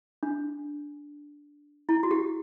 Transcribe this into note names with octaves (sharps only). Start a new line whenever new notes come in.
D4
E4
F#4
G4